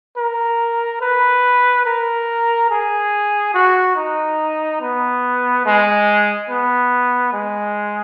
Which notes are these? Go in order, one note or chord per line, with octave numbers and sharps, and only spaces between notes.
A#4
B4
A#4
G#4
F#4
D#4
B3
G#3
B3
G#3